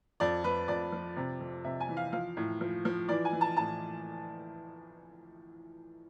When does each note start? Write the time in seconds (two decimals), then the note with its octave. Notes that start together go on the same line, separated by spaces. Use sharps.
0.20 F2 D5
0.44 F2 B4
0.68 F2 D5
0.92 F3
1.16 C3
1.40 F2
1.64 C3 E5
1.80 G#5
1.89 E3
1.97 F5
2.13 F3 F5
2.37 A2
2.61 F3
2.85 F3
3.09 E3 D5
3.25 G#5
3.33 E3
3.41 A5
3.57 A2 A5